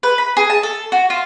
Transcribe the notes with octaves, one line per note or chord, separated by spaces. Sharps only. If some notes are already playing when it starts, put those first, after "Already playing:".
B4
B5
G#4
A5
A4
F#4
F4